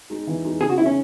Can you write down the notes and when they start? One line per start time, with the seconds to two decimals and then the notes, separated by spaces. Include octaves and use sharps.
0.10 G#3 D#4
0.27 E3
0.44 G#3 D#4
0.61 C#3 G#4
0.70 F#4
0.78 D#4 E4
0.81 G#3 C#4